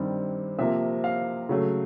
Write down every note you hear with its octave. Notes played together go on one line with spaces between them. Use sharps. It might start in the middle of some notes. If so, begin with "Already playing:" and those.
Already playing: G2 D#3 G3 C4
C3 F3 A#3 E5
F5
C#3 F#3 A3